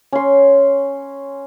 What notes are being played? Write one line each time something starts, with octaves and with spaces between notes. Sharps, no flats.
C#4 C6